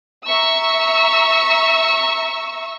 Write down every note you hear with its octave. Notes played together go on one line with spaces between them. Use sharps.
E5 A#5 C#6 E6